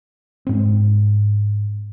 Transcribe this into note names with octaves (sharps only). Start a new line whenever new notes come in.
G#2 C4